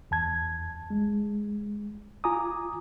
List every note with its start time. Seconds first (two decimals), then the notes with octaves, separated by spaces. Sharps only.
0.11 E2 A5 G#6
0.90 G#3
2.24 F4 G#5 A#5 D6 D#6